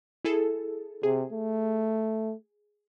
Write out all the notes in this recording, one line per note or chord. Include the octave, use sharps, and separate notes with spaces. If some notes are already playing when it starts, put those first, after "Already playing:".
E4 G#4 A4
C3 G#4
A3